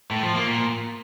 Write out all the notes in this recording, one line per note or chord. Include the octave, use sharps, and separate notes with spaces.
A2
F3
A#3
A#2